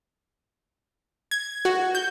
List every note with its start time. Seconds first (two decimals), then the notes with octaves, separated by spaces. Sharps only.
1.31 G#6
1.65 F#4
1.95 G6